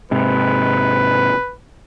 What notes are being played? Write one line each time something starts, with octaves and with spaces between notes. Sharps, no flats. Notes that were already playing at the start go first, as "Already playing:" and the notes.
G#2 C3 B4